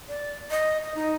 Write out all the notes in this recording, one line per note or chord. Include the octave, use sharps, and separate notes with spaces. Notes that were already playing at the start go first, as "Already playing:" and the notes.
D5
D#5
D#5
D#4